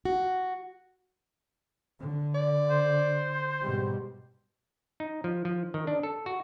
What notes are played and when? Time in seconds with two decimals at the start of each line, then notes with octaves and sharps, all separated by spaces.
0.05 F#4
2.00 D3
2.35 D5
2.70 C5
3.62 G#2 B2 G3
5.00 D#4
5.24 F3
5.45 F3
5.74 D#3
5.87 D4
6.03 A4
6.26 F#4